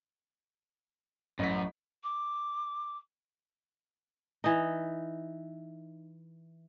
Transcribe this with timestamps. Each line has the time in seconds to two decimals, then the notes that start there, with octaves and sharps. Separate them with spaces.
1.39 A1 F#2 B6
2.03 D6
4.44 E3 D#4